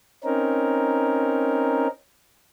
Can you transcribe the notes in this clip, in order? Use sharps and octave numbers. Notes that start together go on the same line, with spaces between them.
C4 C#4 D#4 A#4